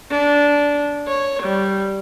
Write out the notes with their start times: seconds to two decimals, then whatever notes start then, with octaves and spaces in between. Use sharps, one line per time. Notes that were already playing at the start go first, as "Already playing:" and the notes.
0.11 D4
1.08 C#5
1.43 G3